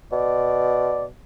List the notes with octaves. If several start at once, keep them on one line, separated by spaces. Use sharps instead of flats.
B2 D5